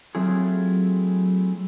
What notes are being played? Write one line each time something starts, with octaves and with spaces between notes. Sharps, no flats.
F#3 A3 C4 E4 F4 G#4